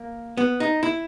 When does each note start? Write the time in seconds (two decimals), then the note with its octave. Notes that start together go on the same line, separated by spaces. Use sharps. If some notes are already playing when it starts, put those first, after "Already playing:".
Already playing: A#3
0.37 B3
0.60 D#4
0.83 E4